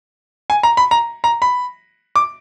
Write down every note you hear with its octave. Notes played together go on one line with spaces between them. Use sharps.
G#5
A#5
B5
A#5
A#5
B5
D6